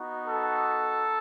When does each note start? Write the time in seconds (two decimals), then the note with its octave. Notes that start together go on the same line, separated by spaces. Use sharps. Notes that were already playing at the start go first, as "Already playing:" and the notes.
Already playing: B3 D#4 F#4
0.26 A4